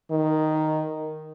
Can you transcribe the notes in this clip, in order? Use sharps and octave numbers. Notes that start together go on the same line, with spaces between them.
D#3